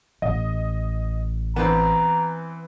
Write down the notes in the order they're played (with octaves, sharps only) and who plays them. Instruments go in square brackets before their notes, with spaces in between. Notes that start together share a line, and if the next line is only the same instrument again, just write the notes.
[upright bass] A1 [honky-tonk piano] D#5
[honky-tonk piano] E3 [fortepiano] B3 C4 [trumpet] A#5